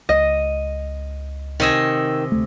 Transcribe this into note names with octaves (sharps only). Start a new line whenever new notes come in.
C#2 D#5
C3 D#3 D#5 G#5 E6
D2 A3